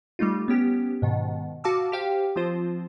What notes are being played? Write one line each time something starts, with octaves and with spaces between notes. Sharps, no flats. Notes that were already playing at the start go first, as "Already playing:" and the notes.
G3 A3 D#4 F4
B3 C#4 G4
G#2 B2 D#3
F#4 F5 A5 D6 E6
G4 C5 F5 G5
F3 C4 F4 C5